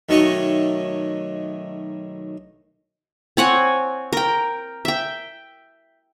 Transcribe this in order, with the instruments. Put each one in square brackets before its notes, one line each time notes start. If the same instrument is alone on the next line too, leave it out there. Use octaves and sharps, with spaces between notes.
[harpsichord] B1 D#3 A3 C#5 D#5 C#6
[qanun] C4 C#5 F#5 G#5
A#4 G5
E5 G5